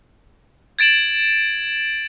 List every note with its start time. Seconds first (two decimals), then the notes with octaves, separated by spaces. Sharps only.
0.79 G#6 A6 D7 E7 F#7